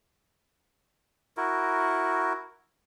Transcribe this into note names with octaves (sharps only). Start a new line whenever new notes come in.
E4 F#4 A#4